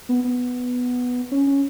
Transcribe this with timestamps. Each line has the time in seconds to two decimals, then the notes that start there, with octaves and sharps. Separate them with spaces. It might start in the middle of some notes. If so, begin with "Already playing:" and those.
0.09 B3
0.24 B3
1.31 C#4
1.47 C#4